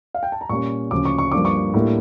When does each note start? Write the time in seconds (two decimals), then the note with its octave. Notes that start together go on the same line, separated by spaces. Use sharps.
0.14 F5
0.23 G5
0.32 A5
0.41 A#5
0.49 A#2 G3 A#3 C#4 C#6
0.91 D2 C#3 F3 C#4 D6
1.05 C#6
1.18 C#6
1.32 G2 F3 A#3 D4 D6
1.45 C#6
1.74 A2 G3 A#3 D4